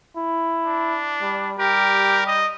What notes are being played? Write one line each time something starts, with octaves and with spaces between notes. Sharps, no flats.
E4
D4
G3
G3 G4 A#4
D#5